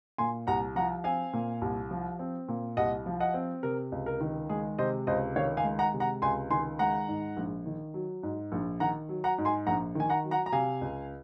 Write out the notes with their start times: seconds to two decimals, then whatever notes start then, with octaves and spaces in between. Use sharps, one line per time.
0.18 A#2 G#5 C6
0.47 C2 F#5 A#5
0.76 F3 F#5 A#5
1.04 C4 F5 G#5
1.33 A#2
1.62 C2
1.91 F3
2.19 C4
2.48 A#2
2.77 C2 D#5 F#5
3.06 F3
3.20 D#5 F#5
3.34 C4
3.63 C3 A#4
3.92 C#2
4.06 A#4
4.20 D#3
4.49 G#3 G#4
4.79 C3 C5 D#5
5.07 C#2 C5 D#5
5.36 D#3 C#5 F5
5.57 F5 G#5
5.64 G#3
5.79 F#5 A#5
5.94 C3
6.00 F#5 A#5
6.22 C#2 G#5 C6
6.50 D#3 G#5 C6
6.79 G#3 F#5 A#5
7.08 G#2
7.37 A#1
7.66 D#3
7.94 F#3
8.23 G#2
8.52 A#1
8.80 D#3 F#5 A#5
9.09 F#3
9.24 F#5 A#5
9.38 G#2
9.45 G#5 C6
9.67 A#1 F#5 A#5
9.95 D#3 G#5
10.10 F#5 A#5
10.24 F#3
10.31 F#5 A#5
10.46 A#5
10.52 C3 F5 G#5
10.81 C#2